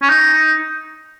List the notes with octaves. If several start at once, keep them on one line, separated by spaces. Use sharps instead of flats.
C#4
D#4
D#4